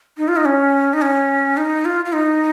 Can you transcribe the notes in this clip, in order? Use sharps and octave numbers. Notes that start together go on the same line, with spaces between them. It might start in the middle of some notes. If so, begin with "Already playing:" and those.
D#4
F4
D#4
C#4
D#4
C#4
D#4
F4
F4
D#4